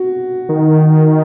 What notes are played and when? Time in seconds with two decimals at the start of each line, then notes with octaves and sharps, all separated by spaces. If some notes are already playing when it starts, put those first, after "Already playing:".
Already playing: F#4
0.49 D#3